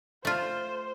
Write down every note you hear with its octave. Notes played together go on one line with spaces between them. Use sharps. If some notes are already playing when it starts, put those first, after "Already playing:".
A3 F4 C5